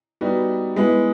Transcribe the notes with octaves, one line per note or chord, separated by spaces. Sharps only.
G3 B3 D#4 F#4
G#3 B3 E4